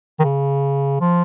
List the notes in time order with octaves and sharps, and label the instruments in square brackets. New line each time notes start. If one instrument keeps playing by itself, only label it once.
[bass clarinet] D#3
C#3
F3